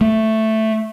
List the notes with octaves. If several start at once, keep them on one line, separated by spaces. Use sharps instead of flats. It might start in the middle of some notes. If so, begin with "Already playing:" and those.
A3